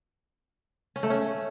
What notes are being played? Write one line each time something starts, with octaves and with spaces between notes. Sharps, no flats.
C#4
A3
C#4